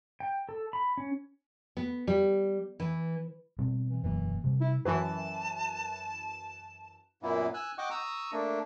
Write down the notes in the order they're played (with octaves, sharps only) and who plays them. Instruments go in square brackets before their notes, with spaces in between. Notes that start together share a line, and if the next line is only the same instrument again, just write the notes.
[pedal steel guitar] G5
A4
B5
C#4
[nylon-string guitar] B3
G3
E3
[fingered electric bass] B2 G3 C4
[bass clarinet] E3
[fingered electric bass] E1 F#2 A#3 [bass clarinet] E3
[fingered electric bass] C3 G3
[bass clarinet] E4
[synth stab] F#2 E3 [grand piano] B4 [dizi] A5
[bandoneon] F#2 A#2 A#3 B3 E4
G#5 E6 F#6
D#5 F#5 G5 C#6 D6
A#5 C#6 D#6 E6
A3 A#3 D4